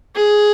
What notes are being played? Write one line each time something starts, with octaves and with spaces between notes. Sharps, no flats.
G#4